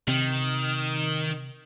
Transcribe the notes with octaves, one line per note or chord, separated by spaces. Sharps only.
C3 D#3 C4